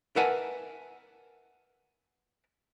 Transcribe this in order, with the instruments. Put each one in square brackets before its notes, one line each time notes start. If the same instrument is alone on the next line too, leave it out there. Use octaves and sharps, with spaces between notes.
[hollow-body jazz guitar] A#4 B4 E5 F#5 G#5 A5